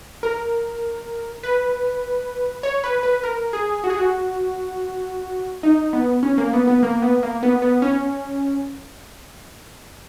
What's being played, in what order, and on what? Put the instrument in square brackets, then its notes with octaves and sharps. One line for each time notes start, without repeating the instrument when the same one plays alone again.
[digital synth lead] A#4
B4
C#5
B4
B4
A#4
G#4
F#4
G#4
F#4
D#4
B3
C#4
A#3
B3
B3
A#3
B3
A#3
B3
B3
C#4